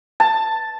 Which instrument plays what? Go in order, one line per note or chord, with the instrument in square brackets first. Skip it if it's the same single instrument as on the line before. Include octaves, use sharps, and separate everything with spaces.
[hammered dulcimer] A5